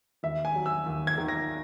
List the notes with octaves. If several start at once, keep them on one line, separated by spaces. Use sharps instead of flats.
D#2 E5
G#5
F#3
E6
D#2
G#6
D#3
A#6